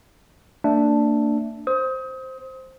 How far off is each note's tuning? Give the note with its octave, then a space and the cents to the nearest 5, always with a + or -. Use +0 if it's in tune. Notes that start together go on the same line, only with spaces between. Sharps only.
A#3 -40 D4 +0 E5 +0
C5 +0 D#6 +35